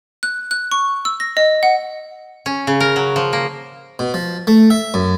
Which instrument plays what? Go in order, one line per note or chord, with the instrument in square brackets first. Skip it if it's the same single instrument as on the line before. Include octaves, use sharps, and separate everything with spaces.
[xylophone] F#6
F#6
C#6
E6
A#6
D#5
F#5
[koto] C#4
C#3
A#4
F#3
F3
A#3
[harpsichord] B2
F3
A3
E5
F#2